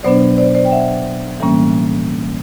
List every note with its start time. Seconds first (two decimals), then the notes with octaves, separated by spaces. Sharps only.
0.03 B2 F#3 B3 D4 C5 D5
0.38 C5 D5
0.55 C5 D5
0.65 G5
0.72 E5 F#5
1.40 A2 E3 G3 A#3 C#4